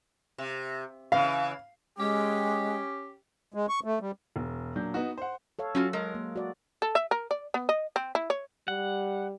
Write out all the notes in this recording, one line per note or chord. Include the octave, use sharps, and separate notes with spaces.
C3
C#3 E3 F5
G#3 C#4 G4
G#3
C#6
A3
G3
E1
A#2 F#3 D4 G6
B3 D#4 F#4
C5 F#5
A4 C#5 F5
F#3 C#4 F4 F#4
G#3 A#4
A#3
F#4 D5
A4
E5
A#4
D5
B3
D#5
C4
E4
C#5
G3 F#5